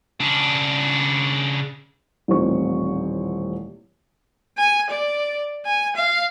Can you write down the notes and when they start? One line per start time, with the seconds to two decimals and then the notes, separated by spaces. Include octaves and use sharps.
0.20 C#3 D4
2.28 D#1 A1 D#3 F3 C4 C#6
4.57 G#5
4.90 D5
5.66 G#5
5.96 F5